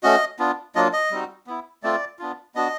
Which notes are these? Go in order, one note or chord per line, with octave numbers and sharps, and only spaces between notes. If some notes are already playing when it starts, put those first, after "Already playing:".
A3 C#4 F#4 D#5
B3 D4 F4
F#3 A#3 D4 F4 D#5
D#5
G3 C4 D#4 F#4
B3 E4
A3 C4 F4 D5
B3 D4 F4
B3 D4 F#4 D#5